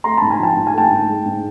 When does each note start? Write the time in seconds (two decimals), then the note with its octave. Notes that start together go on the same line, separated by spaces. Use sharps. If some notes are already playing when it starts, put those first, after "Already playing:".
0.04 A3 A#5 C6
0.17 A5 B5
0.22 G#2
0.30 G#5 A#5
0.39 F3 G5 A5
0.56 G#2 A5
0.67 G#5
0.74 A3 G5 A5
0.91 G#2
1.08 G#3
1.26 G#2